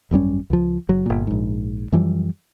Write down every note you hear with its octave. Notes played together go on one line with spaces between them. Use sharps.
G#1 F#2 G3 C#4
C#2 F3
F#1 F#3
G1 A#2
A#1 G#2
F#2 E3 F3 G3